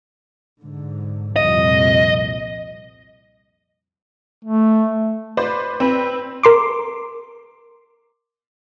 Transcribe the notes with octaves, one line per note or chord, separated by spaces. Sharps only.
G#2 D3
C2 F2 A#2 D#5
A3
B4 C5 D5
C4 B4
A#4 C6 D6